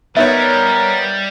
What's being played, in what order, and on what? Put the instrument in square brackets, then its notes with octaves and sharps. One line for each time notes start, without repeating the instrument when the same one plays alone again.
[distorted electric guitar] G3 [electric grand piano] B3 D#4 C#5 [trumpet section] A#4 [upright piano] E5